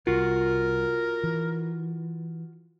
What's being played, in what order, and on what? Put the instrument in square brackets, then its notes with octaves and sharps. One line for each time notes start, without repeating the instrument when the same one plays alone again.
[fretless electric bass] C2 [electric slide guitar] F4 F#4 [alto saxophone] A#4
[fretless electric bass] E3